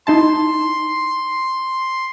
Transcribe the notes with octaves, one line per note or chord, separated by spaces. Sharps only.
D#4 E4 A5 C6